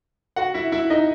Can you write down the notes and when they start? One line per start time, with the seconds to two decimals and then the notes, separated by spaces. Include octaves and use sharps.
0.36 F#4 F#5
0.54 E4 E5
0.72 E4 E5
0.90 D#4 D#5